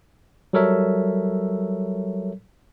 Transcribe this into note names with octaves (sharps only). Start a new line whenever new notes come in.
F#3 G3 A4 A#4 C#5 E5